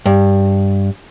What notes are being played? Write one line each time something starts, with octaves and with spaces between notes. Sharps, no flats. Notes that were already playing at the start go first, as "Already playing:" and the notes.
G2